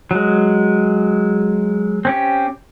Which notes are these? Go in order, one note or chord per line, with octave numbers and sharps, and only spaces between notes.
F#3 G#3
C4 C#4 G4